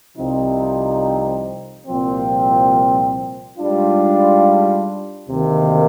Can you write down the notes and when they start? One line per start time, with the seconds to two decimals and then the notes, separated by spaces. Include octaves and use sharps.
0.17 C2 C3 F3 C4 D#4
1.87 C2 A#2 F3 C4
3.58 G#2 G3 D4 F4
5.28 D2 C3 D#3 A#3